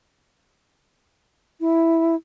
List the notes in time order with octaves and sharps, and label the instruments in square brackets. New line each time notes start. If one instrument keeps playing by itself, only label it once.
[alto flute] E4